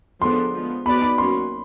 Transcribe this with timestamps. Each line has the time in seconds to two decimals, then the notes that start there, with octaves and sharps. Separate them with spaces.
0.21 D3 F3 G#3 B3 D4 C6
0.53 F3 G#3 B3
0.85 B3 D#4 F#4 B4 D5 B5
1.02 B5
1.18 F#3 A#3 C#4 C6